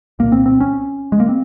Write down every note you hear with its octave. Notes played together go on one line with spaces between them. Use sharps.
C2 A#2 A#3
C4
C4
C#4
G#3
A#3
C4